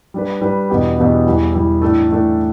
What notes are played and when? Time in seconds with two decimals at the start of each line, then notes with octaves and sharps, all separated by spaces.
0.14 G3 D4 B4
0.41 G3 D4 B4
0.69 E2 B2 B3 D4 G4
0.98 E2 B2 B3 D4 G4
1.27 E2 E3 G3
1.54 E2 E3 G3
1.81 A2 E3 A3 D4 A4
2.09 A2 E3 A3 D4 A4